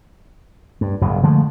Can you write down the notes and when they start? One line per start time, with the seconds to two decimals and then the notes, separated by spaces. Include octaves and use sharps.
0.81 G2
1.01 F#1 G2 B2
1.23 D3 F3 G#3 A3